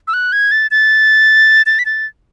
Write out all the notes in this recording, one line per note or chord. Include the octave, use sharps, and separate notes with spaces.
E6
F#6
G#6
A6
A6
A6
B6
A6